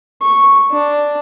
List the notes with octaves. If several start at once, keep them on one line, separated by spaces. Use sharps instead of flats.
C#6
D4